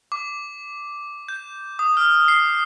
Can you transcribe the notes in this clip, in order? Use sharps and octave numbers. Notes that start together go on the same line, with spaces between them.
D6
G6
D#6
F6
C7